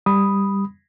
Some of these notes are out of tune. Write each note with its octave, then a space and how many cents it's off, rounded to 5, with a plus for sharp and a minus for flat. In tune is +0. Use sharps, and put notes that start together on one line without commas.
G3 +10 B5 +0 D#6 +0